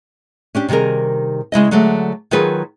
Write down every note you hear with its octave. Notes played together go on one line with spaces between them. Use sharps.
C#4 D4 G4
C3 D#3 G3 G#4 A#4
C#3 G#3 E4 D#5
D3 F#3 G#3 A3
D#3 F#3 F4 G#4 B4